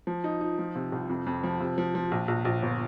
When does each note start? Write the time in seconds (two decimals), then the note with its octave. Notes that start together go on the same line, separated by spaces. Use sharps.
0.07 F3
0.24 D#4
0.41 D#4
0.59 F3
0.76 C3
0.92 C2
1.09 F2
1.26 F2
1.44 F3
1.60 C3
1.78 F3
1.95 F3
2.11 A#1
2.28 A#1
2.45 A#1
2.62 G1